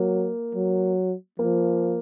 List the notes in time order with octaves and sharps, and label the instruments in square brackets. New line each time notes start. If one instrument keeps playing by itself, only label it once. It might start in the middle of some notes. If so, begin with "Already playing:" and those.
Already playing: [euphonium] F#3 [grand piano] A#3
[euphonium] F#3
[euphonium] F3 [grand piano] A#3